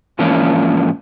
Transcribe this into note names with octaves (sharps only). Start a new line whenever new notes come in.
G#2 E3 F3 A#3 C#4 D4